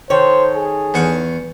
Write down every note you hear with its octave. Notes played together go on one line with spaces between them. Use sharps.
D#3 A4 C5 C#5
G#4
E2 F#5 C#6